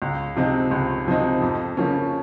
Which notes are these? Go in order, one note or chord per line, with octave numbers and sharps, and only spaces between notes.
C#2
C3 F3 C4 D#4
C#2
C3 F3 C4 D#4
F2
C#3 F3 A#3 C#4